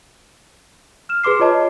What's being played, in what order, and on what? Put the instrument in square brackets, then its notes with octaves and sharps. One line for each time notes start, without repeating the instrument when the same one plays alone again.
[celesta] F6 E7
G#4 B4 C6 D6 C7
F4 C#5 D#5 A5 D6